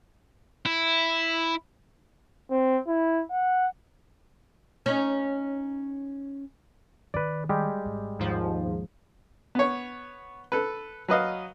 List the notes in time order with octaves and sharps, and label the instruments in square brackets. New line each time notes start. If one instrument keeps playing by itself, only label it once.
[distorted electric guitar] E4
[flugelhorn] C4
E4
F#5
[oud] C#4 D#4
[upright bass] D#3 [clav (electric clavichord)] B4 D5
[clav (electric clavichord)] G3 G#3 G4
[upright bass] G#1
[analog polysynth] D#2 G#2 F3
[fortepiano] B3 C#5
A4 B4
F#3 B4 D#5 F5